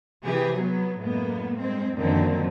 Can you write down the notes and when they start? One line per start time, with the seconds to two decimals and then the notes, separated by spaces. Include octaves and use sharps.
0.24 C3 E3 G4 G#4
0.57 F#3 B3
0.99 F#2 A2 G#3 A#3 B3
1.58 G2 G#3 C4
1.96 F#2 A#2 D3 D#3 F3 C4